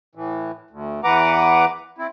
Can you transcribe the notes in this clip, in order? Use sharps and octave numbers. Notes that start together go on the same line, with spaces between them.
A2 E3
D2
E2 E3 B4 F#5 A#5 D6
C4 E4